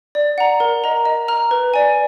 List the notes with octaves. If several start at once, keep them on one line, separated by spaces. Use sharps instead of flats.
D5
F#5 A#5
A#4
D#5 A#5
D#5
A#5 F6
B4
D5 G#5